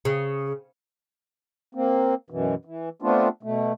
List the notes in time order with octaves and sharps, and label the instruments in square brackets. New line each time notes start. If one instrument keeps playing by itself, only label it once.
[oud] C#3
[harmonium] A#3 C4
F#2 B2 E3
E3
A3 B3 C4 D4 F4
B2 A3